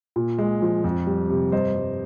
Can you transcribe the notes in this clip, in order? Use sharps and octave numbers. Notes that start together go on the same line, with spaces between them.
A#2
G#3
F3
F2
G3
C3
G2 C5 D#5
G3